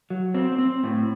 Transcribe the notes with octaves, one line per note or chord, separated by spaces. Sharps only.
F#3
C4
C4
A2